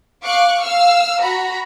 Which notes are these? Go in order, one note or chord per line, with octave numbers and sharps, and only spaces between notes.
F5 C#6 D6 F#6
F5 E6 F6
F#4 A#5 B5